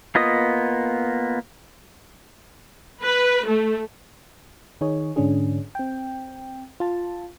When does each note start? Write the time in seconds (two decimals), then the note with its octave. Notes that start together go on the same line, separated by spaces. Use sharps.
0.15 A#3 B3 F4 D#5 D#6
3.04 B4
3.46 A3
4.81 D#3 D#4 G#4 C#5
5.16 G#2 D3 C#4 D4 G#4
5.75 C4 G5
6.80 F4 A5